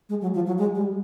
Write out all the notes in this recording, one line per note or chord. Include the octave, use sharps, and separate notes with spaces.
G#3
F#3
F3
F#3
G#3
G3